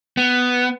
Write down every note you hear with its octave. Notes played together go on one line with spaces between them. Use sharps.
B3